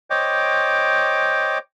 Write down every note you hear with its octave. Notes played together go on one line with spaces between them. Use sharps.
C5 C#5 D#5 G5 D6